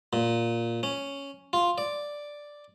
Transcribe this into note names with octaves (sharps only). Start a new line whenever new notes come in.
A#2
C#4
F4
D5